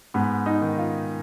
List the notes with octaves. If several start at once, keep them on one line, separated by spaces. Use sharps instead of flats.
G#2 B3
D#4
D#3
F4